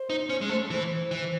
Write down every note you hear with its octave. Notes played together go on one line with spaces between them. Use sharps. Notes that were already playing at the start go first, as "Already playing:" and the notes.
Already playing: C5
D#4
C#4
G#3
A3
E3
E3